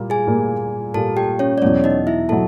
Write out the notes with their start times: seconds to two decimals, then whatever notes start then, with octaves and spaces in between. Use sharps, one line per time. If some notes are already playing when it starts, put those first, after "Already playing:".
Already playing: A#2 G3 A#3
0.10 G#4 G#5
0.27 A#2 G3 A#3
0.94 A#2 G3 A#3 A4 A5
1.17 G4 G5
1.39 C#4 C#5
1.58 D5
1.62 E2 B2 F#3 C#4 C#5
1.84 D#4 D#5
2.07 E4 E5
2.29 B2 F#3 A4 A5